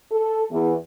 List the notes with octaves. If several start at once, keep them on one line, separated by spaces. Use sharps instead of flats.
A4
E2